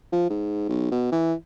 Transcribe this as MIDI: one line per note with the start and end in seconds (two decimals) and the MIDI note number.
0.12 0.28 53
0.30 0.64 44
0.69 0.91 35
0.91 1.08 47
1.12 1.34 52